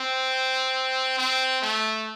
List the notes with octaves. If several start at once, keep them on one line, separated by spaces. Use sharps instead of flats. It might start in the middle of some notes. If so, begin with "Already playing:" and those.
Already playing: C4
C4
A3